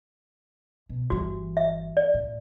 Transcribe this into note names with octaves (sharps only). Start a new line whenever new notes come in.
B2
G1 E3 F#4
E5
D5
A2